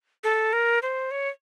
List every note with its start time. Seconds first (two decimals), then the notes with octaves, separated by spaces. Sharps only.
0.24 A4
0.53 A#4
0.82 C5
1.11 C#5